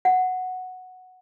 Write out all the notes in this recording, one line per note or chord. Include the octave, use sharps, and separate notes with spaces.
F#5